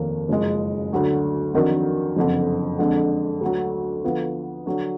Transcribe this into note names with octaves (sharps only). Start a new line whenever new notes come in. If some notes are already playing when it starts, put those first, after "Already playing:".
Already playing: F1 D#2 D#3 A#3
F#1 F#2 F3 G#3
D2 D3 F#3 D4
F2 D#3 F#3 D4 F#4
F#1 F2 D3
F2 D3 G#3 D4
D2 D3 F#3
D3 F3 B3 F4
D3 F#3 D4